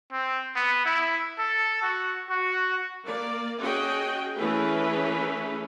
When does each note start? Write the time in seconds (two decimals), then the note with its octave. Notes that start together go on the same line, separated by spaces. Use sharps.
0.12 C4
0.55 B3
0.86 E4
1.39 A4
1.82 F#4
2.30 F#4
3.05 A#3 D5
3.62 C#4 F#4 G#4 D#5 G5
4.37 E3 A3 C#4 E4 G#4 B4